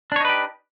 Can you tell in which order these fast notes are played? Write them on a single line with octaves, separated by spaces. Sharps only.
D4 C#5 D#4 B4 G4